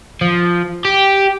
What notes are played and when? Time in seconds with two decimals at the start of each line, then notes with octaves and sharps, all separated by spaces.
0.21 F3
0.85 G4